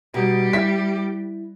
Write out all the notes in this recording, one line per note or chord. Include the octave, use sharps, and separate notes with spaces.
B2 G3 D#4 G4
E4 E5 B6